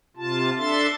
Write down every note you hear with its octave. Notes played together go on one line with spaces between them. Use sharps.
C3 F4 A5
D4 A4 E5 C6 A6